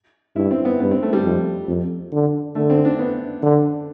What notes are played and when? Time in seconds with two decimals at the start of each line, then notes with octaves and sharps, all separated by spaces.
0.36 G2 E4
0.51 C4
0.65 B3
0.80 G2 B3
0.91 C4
1.03 A3
1.13 G3
1.24 F2
1.68 F2
2.12 D3
2.55 D3 A3
2.70 C4
2.85 D4
2.99 B3
3.43 D3